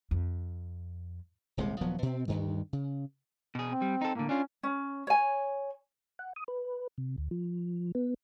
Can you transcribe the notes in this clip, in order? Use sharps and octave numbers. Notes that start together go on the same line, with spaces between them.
F2
D#1 C2 C3 G#3
D#1 F3 F#3 B3
B2 C4
D2 G2 D#3
C#3
B2 G#4
C4
G3
D#4 A4
A2 D3 A#3
C#4 D4 F4
C#4
C#5 G#5
F#5
D#6
B4
C3
D2
F3
B3